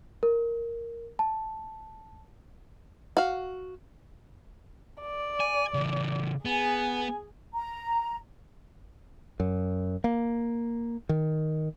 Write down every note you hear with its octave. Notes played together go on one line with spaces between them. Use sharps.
A#4
A5
F#4 F5
D5
G#5
C#3 E3
B3 G#4 G#5
A#5
F#2
A#3
D#3